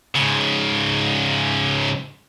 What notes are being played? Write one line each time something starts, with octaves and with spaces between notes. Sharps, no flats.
G#2 C#3